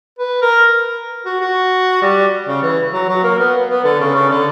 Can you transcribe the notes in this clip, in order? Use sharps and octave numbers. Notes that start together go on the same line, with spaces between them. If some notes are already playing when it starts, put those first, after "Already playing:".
B4
A#4
F#4
F#4
G3
C#3
E3
F#3
F#3
A#3
B3
B3
D3
C#3
C#3
D3